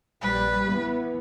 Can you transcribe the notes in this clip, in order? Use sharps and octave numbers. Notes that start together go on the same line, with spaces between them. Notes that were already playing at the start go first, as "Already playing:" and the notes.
A#1 G3 B4
E3 B3